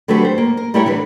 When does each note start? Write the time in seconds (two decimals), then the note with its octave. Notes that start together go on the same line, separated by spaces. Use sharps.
0.08 D3 F#3 A3 C4 G4 B4
0.25 C5
0.38 A#3
0.57 A#4
0.74 G3 A3 E4 G4 A#4 C#5
0.86 D3 E3 B4